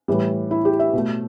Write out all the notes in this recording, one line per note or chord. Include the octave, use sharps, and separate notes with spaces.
A2 E3 G3
E4
G4
E5
B2 A3